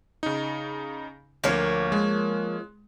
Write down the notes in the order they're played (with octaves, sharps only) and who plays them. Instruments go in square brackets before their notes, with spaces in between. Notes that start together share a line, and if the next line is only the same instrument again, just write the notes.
[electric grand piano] C#3 D#4
[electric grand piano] D2 [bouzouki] F3 A#3 C#5
[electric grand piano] G#3